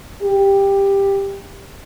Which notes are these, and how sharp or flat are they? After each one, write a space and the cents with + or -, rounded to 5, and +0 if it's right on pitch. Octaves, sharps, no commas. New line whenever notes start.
G4 +10